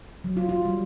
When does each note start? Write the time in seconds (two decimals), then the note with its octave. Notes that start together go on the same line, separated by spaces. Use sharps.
0.24 F#3
0.37 F4
0.49 F4
0.65 G3